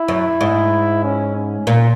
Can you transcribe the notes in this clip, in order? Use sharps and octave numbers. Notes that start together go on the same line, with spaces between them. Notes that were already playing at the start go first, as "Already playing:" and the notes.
Already playing: E4
F#2
G#2
C#4
C#4
A#2